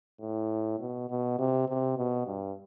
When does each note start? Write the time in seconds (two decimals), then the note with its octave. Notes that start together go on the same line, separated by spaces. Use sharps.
0.21 A2
0.80 B2
1.10 B2
1.39 C3
1.68 C3
1.97 B2
2.27 G2